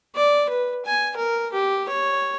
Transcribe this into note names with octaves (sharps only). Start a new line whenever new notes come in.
D5
B4
G#5
A#4
G4
C#5